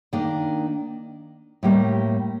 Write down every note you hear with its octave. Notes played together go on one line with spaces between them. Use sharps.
D#3 A#3 D4
A2 G3 A#3